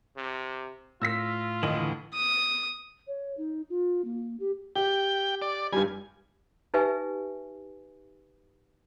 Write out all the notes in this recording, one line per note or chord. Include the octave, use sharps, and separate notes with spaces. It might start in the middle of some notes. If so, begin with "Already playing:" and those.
C3
A2 F4 E6 A#6 B6
D#2 D3 E3 D#5
D#6
C#5
D#4
F4
A#3
G4
G4 G5
D5
G2 G3 G#5
D#4 G4 B4 E5 G#5